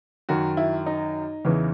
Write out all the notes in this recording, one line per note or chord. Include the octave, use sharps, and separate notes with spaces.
F#2 D#3 F#4
E4
D#4
E2 C#3 E3